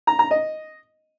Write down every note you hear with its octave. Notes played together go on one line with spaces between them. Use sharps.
A#5
A#5
D#5